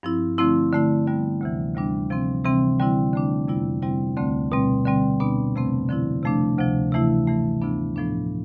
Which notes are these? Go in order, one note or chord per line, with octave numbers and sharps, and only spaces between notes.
G2 F3 C4 E4
D3 F3 A3 C4 E4
D3 A3 E4
D3 G3 B3
D2 C3 E3
D2 C3 G3 B3 D4
C3 F3 C4
C3 E3 G3 C4
D3 G3 C4 E4
D3 A3 D4
F2 C3 G3 B3 E4
C3 G3 C4 E4
D2 D3 A3 C4
B2 G3 C4
D3 G3 C4
B2 B3 D4
F2 C3 F3 A3 C4
D3 F3 C4 E4
C3 F3 A3 D4
D2 C3 F3
C3 E3 A3 E4
G2 E3 A3
D2 C3 F3 B3 D4
A2 F3 B3 D4